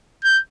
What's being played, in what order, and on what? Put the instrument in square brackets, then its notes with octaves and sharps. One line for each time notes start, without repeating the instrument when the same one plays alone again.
[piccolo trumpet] G6